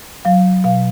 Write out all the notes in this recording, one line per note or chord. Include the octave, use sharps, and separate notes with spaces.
F#3 F5
B2 F5